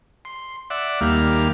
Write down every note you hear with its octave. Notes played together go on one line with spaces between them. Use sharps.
C6
D5 E5 F#5
D#2 G3 A#3 F5